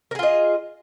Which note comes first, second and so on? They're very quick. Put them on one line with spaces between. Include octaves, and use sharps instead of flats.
A#4 G#4 F4 D#5